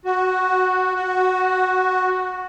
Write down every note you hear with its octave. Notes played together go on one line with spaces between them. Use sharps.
F#4
F#4